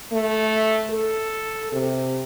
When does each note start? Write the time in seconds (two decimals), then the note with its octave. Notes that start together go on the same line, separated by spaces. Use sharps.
0.12 A3
0.90 A4
1.72 C3